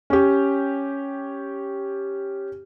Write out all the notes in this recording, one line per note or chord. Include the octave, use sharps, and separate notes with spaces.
C#4 G4